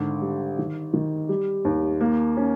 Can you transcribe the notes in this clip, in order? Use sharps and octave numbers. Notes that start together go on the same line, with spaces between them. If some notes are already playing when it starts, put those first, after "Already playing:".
Already playing: G#1 D3
G3
D#3
D#3
G3
D#2
A#3
C#4